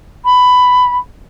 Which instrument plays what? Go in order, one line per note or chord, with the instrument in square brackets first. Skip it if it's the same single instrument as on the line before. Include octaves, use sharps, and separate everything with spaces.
[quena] B5